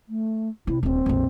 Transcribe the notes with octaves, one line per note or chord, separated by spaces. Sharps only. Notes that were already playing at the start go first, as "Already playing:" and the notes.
A3
C3 E4
D#1 A#1 C4
A#1 F2